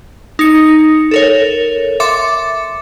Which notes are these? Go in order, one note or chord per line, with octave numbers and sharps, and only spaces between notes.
D#4 C#7
A4 A#4 C#5
E5 C6 D6 A6 C#7